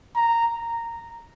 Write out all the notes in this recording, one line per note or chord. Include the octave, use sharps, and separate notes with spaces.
A#5